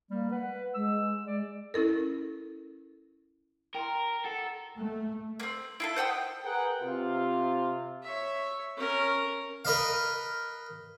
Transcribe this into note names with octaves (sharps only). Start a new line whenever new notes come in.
G3 A#3
B4 F#5
G#3 E6
G#3 D5
C#4 E4 A4 A#4
A#4 G5 A#5 C6
A4 F#5
A#5
A3
A#3 C4
E4 F4 A4
C5 F#5 G5 D#6
G#4 A#4 B4 F#5 G5
C3 F4
C#5 E5
C#4 A#4
A#4 B4 D#5 F5